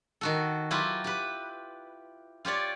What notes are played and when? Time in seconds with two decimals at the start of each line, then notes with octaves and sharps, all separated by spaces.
0.21 D#3 F#4 A4
0.71 F#3 E4 F4 G4 B4
1.04 G4 B4
2.45 F4 G4 C#5 D5